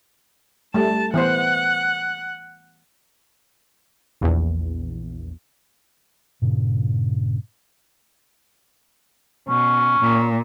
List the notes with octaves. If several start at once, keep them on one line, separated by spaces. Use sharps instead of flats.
G3 A3 A5
E3 B3 C5 F#5
A#1 E2
G2 A#2 C#3
B2 C#4
A#2